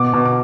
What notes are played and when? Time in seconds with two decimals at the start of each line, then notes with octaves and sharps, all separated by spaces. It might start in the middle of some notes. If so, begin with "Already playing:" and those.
Already playing: B2 D6
0.13 B2
0.26 D6